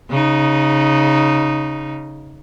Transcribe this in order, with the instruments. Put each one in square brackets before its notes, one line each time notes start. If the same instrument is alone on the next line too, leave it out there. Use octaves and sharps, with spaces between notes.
[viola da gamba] C#3 D#4